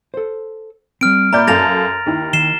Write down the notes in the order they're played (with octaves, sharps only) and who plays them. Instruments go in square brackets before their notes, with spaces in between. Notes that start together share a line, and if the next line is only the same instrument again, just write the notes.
[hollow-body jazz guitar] A4 C5
[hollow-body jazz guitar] G3 C4 [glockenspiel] F6 D7
[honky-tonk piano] A#2 D5 G6 [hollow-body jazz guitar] E5 B5 [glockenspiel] A#5
[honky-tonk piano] F#2 A4 F5 [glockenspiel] A6 A#6 F7
[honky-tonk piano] D#2 E4
[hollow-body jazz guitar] D#3 [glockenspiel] C7 E7 G7